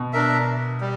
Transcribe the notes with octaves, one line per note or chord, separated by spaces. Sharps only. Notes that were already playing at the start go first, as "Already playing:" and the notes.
Already playing: B2
D4 A#4 E5
G3